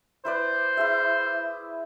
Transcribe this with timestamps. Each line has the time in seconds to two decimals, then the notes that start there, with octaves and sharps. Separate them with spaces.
0.25 E4 B4 C5 D5
0.77 E4 G#4 E5